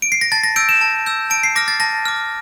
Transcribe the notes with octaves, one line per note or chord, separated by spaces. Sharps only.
D7
C7
A#6
A5 A6
A#6
E6 G6 D7
E7
A5
E6 G6
A5 D7
C7
D6 F6 A#6
A6
A5 A#6
D6 F6